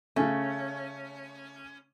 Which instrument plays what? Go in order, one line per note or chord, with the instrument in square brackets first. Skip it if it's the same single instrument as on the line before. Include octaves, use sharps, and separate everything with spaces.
[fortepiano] C#3 A3 [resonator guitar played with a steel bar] C#4